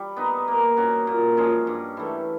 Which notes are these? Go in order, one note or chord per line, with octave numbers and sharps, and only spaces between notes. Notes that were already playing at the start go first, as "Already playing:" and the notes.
Already playing: G3
B3 D#4
A#3
C#4 F#4
A#2
F3 G#3 C#4
G2
E3 A3